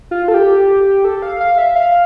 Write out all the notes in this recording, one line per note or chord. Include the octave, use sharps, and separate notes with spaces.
F4
A4
G4
A4
F5
F5
E5
F5